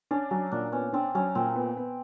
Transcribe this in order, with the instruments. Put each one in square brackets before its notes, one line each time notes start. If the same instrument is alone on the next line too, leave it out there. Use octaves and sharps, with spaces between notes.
[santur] C#4 [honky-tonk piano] D4
[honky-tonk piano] F#3 [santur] C#4
[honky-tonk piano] A#2 [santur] D4
[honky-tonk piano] B3 [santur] C#4
[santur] C4 [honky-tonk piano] D4
[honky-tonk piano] F#3 [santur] C#4
[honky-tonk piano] A#2 [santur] C4
[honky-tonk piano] B3
B3